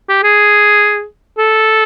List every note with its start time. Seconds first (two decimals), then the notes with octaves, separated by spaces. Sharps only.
0.09 G4
0.23 G#4
1.38 A4